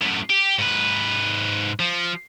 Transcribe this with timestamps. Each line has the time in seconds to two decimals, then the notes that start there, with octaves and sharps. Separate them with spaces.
0.02 F#2 A2
0.30 G4
0.59 G#2 B4
1.80 F3